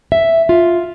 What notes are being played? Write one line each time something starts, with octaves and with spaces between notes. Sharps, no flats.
E5
F4